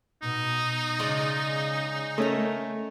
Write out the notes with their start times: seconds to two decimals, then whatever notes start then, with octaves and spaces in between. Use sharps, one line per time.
0.23 B2 D#4
0.99 C#3 G#3 F4 D5
2.18 A3 C#4 A#4 D#5 A#5